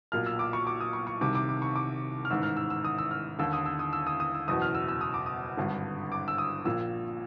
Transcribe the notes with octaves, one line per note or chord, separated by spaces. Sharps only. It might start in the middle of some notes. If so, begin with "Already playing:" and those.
B1 A#2 F6
E6
D6
C#6
D6
D#6
C#6
C#6
C2 C3 D#3 D6
D6
D6
C#6
D6
F6
A1 G#2 D#3 E6
F6
E6
E6
D#6
E6
F6
D#2 D3 E6
D#6
E6
D#6
E6
D#6
D#6
E6
F#1 E2 B2 D#6
F6
E6
E6
D#6
D6
D#6
G#1 G2 D3
D6
E6
D#6
A#1 A#2 E6